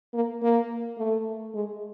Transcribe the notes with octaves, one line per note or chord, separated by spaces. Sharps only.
A#3
A#3
A3
G#3